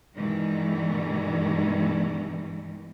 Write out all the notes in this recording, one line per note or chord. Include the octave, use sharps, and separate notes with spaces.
G2 B2 D#3 E3 G#3